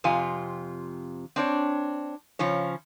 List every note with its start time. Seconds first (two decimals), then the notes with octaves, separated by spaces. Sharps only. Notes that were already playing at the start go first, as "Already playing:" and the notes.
0.04 F2 C3 F4 G#5
1.36 C4 D4 C#5
2.39 C#3 F3 C#4 C#5